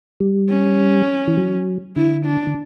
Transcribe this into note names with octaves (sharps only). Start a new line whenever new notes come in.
G3
C#4
E3
F#3
D3 E4
D4
D3